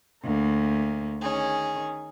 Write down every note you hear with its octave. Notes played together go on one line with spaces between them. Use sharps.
D2 A#3
D#3 C#4 G#4